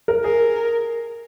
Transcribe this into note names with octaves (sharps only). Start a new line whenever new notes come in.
A#4
G#4 A#4